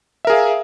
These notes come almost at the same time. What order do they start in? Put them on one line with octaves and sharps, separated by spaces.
E5 A#4 G#4 F5